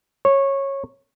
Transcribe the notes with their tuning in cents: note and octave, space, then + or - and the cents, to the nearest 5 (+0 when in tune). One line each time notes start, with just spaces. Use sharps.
C#5 -15